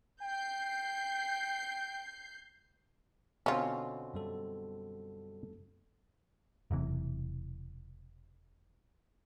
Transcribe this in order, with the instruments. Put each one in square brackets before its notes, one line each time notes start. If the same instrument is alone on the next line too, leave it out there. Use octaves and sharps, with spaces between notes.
[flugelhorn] G5 [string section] G6 C7
[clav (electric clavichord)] B2 D3 C4 [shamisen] C#4 F4
[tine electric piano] F#2 G3 A4
[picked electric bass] E1 F#2 C3 E3